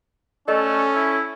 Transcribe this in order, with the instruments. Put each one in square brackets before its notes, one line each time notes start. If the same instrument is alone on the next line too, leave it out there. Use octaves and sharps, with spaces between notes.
[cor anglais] A3 [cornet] C#4 [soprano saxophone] A4 [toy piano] D5 D#5
[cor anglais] E4